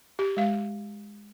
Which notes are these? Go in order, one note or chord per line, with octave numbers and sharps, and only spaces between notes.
G4
G#3 F5